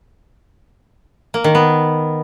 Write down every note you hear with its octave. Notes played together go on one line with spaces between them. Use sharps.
A#3
D#3
B3